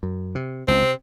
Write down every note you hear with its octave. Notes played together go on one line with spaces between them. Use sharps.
F#2
C3
C#2 C4
C3